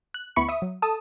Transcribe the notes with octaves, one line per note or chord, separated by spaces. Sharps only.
F#6
D2 B3 E4 B5 C#6 C#7
E5 D#6
F#3
A4 A5 D#6